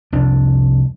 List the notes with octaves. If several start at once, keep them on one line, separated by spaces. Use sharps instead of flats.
C2 F2 D4